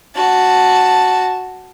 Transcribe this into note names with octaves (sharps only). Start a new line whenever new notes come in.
F#4 A5